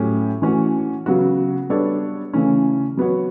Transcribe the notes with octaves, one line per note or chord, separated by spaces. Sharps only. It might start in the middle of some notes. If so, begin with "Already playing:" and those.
Already playing: A2 F#3 C#4 G4
E3 A3 C#4 F#4 C#5
C#3 F#3 B3 F#4
G3 B3 D4 A4 C#5
C#3 E3 A3 C#4
F#3 B3 F#4 C#5